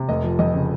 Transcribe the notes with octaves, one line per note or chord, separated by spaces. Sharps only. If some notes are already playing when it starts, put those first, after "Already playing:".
Already playing: C3
F1 D#5
F3
F2 D#5
C#3